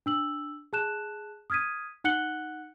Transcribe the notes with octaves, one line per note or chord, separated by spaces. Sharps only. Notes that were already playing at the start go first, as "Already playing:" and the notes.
D4 E6 F#7
G#4 A5 F#6 E7
D#6 F6 G#6 B6 D#7
D#4 F#5 F#6 C#7 F#7 G7